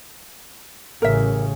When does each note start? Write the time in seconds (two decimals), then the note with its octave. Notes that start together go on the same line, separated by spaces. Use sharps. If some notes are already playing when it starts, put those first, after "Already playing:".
1.02 A1 C#3 A#4 E5